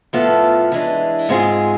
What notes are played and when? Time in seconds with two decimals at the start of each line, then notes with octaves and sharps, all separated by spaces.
0.13 A2 F3 B3 F4 A4
0.72 E3 G#3 D4
1.29 G#2 G#3 C4 F4 G#4